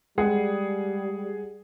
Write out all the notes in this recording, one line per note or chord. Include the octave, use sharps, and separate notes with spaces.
G3 G#3 G#4 F#5